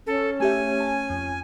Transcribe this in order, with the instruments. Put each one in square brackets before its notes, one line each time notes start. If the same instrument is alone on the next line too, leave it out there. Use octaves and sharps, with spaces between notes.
[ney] C#4 [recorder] A4
[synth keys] A3 G4 E5 [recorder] G#5
[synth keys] A5
F2